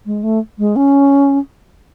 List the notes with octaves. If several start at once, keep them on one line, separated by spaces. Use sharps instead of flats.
G#3
A3
G#3
C#4